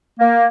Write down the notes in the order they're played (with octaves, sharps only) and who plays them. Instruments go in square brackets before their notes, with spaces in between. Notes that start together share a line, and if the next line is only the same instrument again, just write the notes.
[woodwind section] A#3